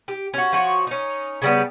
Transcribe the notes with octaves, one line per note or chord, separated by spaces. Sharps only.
G4
C#4 F#4
F3 F#4 C#5
C#4 D#4
C#3 G3 B3